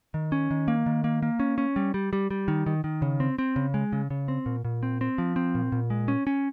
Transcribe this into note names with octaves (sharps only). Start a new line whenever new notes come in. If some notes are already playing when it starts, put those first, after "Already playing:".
D#3
C#4
D#3
A#3
D#3
A#3
A#3
C#4
C#4
G3
G3
G3
G3
D#3
D#3
D#3
C#3
C4
C4
C#3
G#3
C#3
C#3
C4
A#2
A#2
C4
C4
F3
C4
A#2
A#2
G#3
C#4
C#4